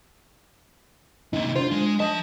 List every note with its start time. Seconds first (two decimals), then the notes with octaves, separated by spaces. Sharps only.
1.33 C3 A#3 D#4
1.56 D4 F4 C5
1.71 G#3
2.00 F3 D#5 A5